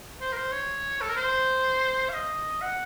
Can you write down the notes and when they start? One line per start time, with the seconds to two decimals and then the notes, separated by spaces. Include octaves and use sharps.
0.21 C5
0.32 A#4
0.37 C5
0.52 C#5
1.01 A4
1.09 A#4
1.17 C5
2.09 F5
2.13 D#5
2.61 F#5